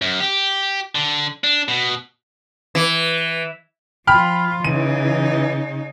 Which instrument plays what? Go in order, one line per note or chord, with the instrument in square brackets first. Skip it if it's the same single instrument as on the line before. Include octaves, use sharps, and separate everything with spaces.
[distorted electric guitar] F#2
G4
D3
D4
B2
[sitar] E3
[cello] F3 F4 [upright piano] G5 B5 F6
[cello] C#3 D#4 [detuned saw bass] E3 [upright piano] D#7